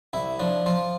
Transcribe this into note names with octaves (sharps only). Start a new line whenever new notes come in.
C2 E4
F3 D4
F3 F4